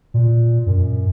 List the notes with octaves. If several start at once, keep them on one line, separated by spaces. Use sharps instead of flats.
A#2
F#2